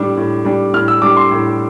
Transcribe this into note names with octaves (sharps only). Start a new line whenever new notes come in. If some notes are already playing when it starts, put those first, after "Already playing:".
Already playing: A2 G3 D4
A2
G3 D4
A2 F6
E6
G3 D4 D6
C6
A2